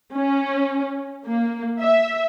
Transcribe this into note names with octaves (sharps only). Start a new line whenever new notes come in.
C#4
A#3
E5